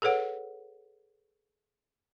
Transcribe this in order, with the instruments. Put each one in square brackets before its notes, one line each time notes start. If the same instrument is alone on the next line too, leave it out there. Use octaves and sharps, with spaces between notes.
[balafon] G#4 A4 B4 C#5 F#5